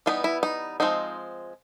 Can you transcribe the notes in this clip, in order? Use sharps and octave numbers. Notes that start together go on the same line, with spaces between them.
E3 G3 B3 D#4 F4
E4
D#4
F3 G#3 C4 D#4